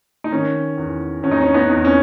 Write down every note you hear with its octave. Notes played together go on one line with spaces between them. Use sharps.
D#4
D#3 C#4
E2
E2 C#4
D#4
C#4
B3 D#4
E2
C#4